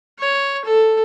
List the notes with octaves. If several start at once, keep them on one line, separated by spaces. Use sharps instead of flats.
C#5
A4